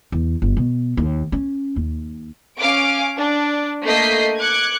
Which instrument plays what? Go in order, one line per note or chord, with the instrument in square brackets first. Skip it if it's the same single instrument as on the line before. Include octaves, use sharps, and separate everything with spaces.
[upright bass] E2
G1
B2
D#2
C#4
D#2
[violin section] C#4 F5 G#5 D6 D7
D4
A3 A#3 D#5 G6 B6 C7
D6 F#6 G#6 C#7